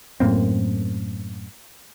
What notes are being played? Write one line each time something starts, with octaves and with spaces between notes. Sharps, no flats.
F#2 A2 A#3 C4